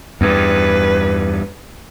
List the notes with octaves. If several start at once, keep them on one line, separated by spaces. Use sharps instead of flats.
E2 G2 B4